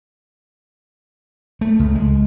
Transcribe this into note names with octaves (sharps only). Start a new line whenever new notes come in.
A3
C#2
G#3